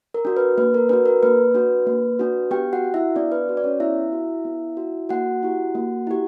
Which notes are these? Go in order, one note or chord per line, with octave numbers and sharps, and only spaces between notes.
A#4
D4 F#4
B4
A#3 B4
A#4
D4 F#4 B4
A#4
A#3 B4
D4 F#4
A#3
D4 F#4
B3 G4 G5
F#4 F#5
F#4
E4 E5
B3 D4 D5
B4
F#4
D5
C#4 C#5
B3 E4 E5
F#4
B3
F#4
A#3 F#4 F#5
E4 G4
A#3
E4 G4